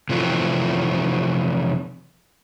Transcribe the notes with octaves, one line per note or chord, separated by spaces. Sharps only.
C3 E3 F3 A3